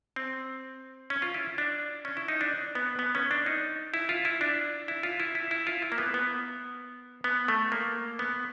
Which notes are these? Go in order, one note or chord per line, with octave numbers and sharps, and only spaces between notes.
C4
C#4
F4
E4
D4
C#4
E4
D#4
D4
B3
B3
C#4
D4
D#4
E4
F4
E4
D4
E4
F4
E4
E4
E4
F4
E4
A#3
B3
B3
B3
A3
A#3
B3